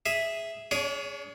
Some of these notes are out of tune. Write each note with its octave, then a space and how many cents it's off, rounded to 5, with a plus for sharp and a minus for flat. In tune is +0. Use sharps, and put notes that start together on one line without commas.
G#4 +0 E5 +0
D4 -45 G#4 +0 C#5 +15